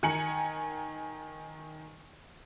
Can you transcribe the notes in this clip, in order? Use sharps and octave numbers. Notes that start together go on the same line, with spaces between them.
D#3 G#5 A#5 C#7 F#7